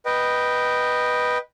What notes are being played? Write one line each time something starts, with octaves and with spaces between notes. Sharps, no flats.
B4 D#5 G5